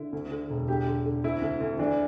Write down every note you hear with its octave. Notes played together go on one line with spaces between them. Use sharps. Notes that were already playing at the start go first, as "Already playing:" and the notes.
Already playing: D3 E4
D2
D3
E1
D3 G4
D3
D3
D2 E4
D2
D2
E3 D4